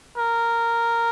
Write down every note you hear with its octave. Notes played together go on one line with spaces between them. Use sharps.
A#4